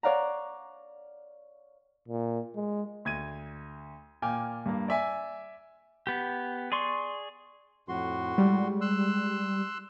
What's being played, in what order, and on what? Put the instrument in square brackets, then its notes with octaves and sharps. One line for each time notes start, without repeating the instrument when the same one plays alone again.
[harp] C#5 D5 F5 F#5 A#5
[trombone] A#2
G#3
[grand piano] D2 G#6 D#7
A#2 G5 G#5 D6 F6
G2 A#3
D5 E5 G#5
[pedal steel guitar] B3 G4
G#4 D5 C6 C#6
[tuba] F2 [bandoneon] A2 F#4 C6
[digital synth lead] G3 [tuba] G#3
[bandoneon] C6 E6 F#6